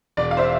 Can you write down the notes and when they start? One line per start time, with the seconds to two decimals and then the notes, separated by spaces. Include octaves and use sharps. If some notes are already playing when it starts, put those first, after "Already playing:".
0.17 E1 D5
0.31 F5
0.37 C5 E5